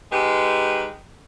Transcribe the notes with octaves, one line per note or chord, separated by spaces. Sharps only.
G#2 G#3 G4 B4